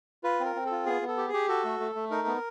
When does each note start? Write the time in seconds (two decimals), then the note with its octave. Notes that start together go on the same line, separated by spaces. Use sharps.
0.24 F4 B4
0.40 C4
0.45 A#4
0.56 C4
0.66 A4
0.71 F4
0.86 B3 G#4
1.02 B3
1.08 A4
1.17 G4
1.28 G#4
1.34 G4
1.49 F#4 A4
1.64 A3
1.80 A3
1.95 A3
2.11 D#4 A#4
2.27 B3